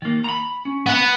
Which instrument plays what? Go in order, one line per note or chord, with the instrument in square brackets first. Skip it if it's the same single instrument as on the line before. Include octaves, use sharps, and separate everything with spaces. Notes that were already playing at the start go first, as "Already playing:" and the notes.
[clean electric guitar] D#3 A#3
A#5 B5
C#4
[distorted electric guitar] B3 F#5